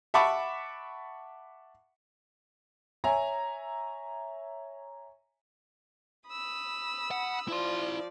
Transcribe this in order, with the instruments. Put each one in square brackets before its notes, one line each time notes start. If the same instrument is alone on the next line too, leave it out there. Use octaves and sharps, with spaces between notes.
[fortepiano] E5 F#5 A5 B5 C#6 D6
[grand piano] C#5 E5 G#5 A#5
[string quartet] B5 D#6 E6
[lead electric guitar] F#5
[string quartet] F3 D5 [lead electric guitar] E4 C6